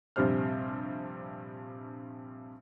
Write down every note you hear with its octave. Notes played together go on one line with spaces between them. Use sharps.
A#1 G2 C3 G3 C5 F6